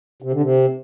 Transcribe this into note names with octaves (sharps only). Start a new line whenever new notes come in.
C3
D3
C3